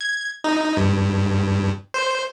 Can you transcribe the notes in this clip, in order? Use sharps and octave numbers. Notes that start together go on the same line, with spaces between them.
G#6
D#4
G2
C5